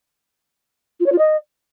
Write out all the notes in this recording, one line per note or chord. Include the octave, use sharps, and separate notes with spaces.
F4
C#5
F4
D#5